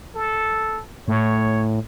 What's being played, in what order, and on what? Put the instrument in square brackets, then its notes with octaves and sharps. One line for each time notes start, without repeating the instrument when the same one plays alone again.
[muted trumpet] A4
[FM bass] A2 [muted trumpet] C#5